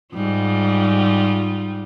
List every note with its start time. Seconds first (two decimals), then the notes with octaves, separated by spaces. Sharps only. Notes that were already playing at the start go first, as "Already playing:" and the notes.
0.14 G#2 G3 F4